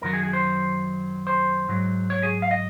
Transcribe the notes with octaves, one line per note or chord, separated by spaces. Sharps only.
F#2 D#3 F#3 A#4
G#4
G#4
C5
C5
G#2 F#3
C#5
G#4
F5
D#5